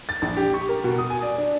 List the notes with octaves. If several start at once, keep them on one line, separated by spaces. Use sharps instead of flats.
A6
A#1
G4
C#6
A#4
B2
D#6
G#5
D5
D4